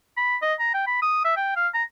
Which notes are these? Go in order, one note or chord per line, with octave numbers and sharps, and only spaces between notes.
B5
D#5
A#5
G5
B5
D#6
E5
G5
F5
A#5